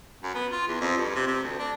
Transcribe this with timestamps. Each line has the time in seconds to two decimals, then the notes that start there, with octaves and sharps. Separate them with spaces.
0.23 F#2
0.35 B3
0.52 F4
0.68 E2
0.81 F2
0.97 G2
1.15 C3
1.27 C3
1.43 D2
1.59 D4